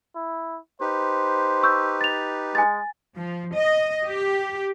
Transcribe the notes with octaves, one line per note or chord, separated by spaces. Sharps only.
E4
D#4 G4 B4 C5
C#6 E6 G6
A6 F7
G#3 G#5 A6
F3
D#5
G4